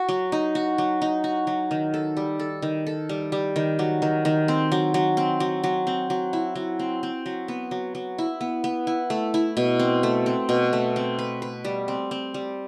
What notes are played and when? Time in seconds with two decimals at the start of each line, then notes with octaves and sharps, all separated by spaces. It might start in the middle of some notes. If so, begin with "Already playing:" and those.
Already playing: F#4
0.09 F#3
0.32 D#4
0.55 F#4
0.78 F#3
1.02 D#4
1.24 F#4
1.47 F#3
1.71 D#3
1.94 A4
2.17 G3
2.39 A4
2.62 D#3
2.87 A4
3.09 G3
3.32 G3
3.56 D#3
3.79 F#3
4.02 D#3
4.25 D#3
4.48 C4
4.72 F#3
4.94 F#3
5.17 C4
5.40 F#3
5.64 F#3
5.87 C4
6.10 F#3
6.33 E4
6.55 F#3
6.79 C4
7.03 C4
7.26 F#3
7.48 B3
7.71 F#3
7.95 F#3
8.18 E4
8.41 B3
8.64 B3
8.87 E4
9.10 A3
9.34 E4
9.57 B2
9.79 C4
10.03 A3
10.26 C4
10.49 B2
10.73 A3
10.96 C4
11.19 B4
11.42 B4
11.65 G3
11.88 C4
12.11 C4
12.34 G3